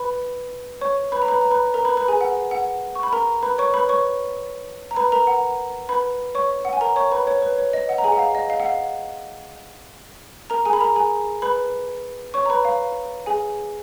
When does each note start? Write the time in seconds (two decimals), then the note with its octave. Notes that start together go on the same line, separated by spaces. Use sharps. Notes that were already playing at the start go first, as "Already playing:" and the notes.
Already playing: B4 B5
0.81 C#5 C#6
1.12 B4 B5
1.22 A#5
1.28 B4 B5
1.41 A#5
1.51 B4 B5
1.74 A#4 A#5
1.85 B4 B5
1.97 B4 B5
2.08 G#4 G#5
2.21 F#5
2.51 F#5
2.95 C#6
3.03 B5
3.12 A#4 A#5
3.43 B4 B5
3.58 C#5 C#6
3.74 B4 B5
3.89 C#5 C#6
4.91 A#5
4.96 B4 B5
5.12 A#4 A#5
5.27 F#5
5.89 B4 B5
6.35 C#5 C#6
6.65 F#5
6.73 G#5
6.81 A#4 A#5
6.96 C#5 C#6
7.12 B4 B5
7.27 C#5
7.42 B4
7.58 C#5
7.73 D#5
7.89 F#5
7.98 A#5
8.04 G#4 G#5
8.12 F#5
8.19 F5
8.35 D#5
8.50 F5
8.60 F#5
8.66 F5
10.50 A#4 A#5
10.65 G#4 G#5
10.73 B5
10.81 A#4 A#5
10.96 G#4 G#5
11.42 B4 B5
12.34 C#5 C#6
12.46 A#5
12.50 B4 B5
12.65 F5
13.26 G#4 G#5